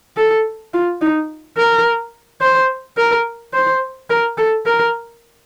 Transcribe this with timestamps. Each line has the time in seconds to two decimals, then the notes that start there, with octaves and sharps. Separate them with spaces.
0.17 A4
0.73 F4
1.01 D#4
1.58 A#4
2.42 C5
2.97 A#4
3.53 C5
4.10 A#4
4.37 A4
4.66 A#4